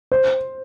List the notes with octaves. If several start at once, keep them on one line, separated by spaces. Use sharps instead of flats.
C5